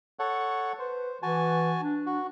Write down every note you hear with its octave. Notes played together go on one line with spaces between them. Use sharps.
A4 C#5 F#5
B4 C5
E3 F#4 G#5 A5
D4
F#4